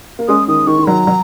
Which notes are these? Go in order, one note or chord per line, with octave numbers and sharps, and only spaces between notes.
A#3
G#3 C#4 D#6
D#3 D#6
D#3 C#6
D#3
F#3 A#5
F#3